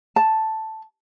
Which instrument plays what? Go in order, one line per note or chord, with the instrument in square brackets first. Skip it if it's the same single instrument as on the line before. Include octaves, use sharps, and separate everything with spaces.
[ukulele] A5